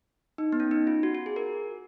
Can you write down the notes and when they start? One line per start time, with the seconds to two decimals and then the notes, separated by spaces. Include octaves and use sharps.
0.38 D#4
0.52 B3
0.60 C#4
0.71 D#4
0.87 F4
1.03 F#4
1.15 F#4
1.26 G#4
1.36 A#4